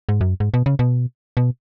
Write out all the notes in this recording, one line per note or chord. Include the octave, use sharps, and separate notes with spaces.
G#2
F#2
G#2
B2
C#3
B2
B2